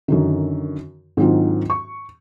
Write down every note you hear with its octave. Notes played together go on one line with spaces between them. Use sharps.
F#2 D3 D#3
G#2 D#3 F#3 C4 D4 F4
C#6